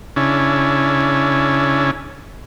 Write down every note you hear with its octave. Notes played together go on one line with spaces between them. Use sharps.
C#3 C#4 D4 E4